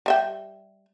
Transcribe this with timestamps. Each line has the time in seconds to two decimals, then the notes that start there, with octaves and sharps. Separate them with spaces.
0.06 G3 E5 G5